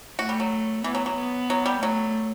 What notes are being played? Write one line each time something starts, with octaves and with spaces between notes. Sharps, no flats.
A3 F#4
G3
F#3
E3 B3
F#3
F#3
B3
F#3
G3
F#3 A3